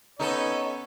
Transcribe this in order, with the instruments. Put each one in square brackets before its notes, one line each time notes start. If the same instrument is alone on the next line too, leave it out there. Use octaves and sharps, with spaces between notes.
[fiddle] B3 C#4 [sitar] D#4 A4 [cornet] C#5